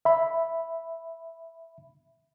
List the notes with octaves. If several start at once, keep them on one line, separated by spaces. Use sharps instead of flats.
E5 B5